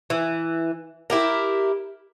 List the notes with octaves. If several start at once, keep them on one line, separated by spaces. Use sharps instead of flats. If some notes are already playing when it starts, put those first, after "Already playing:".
E3
E4 G4 A#4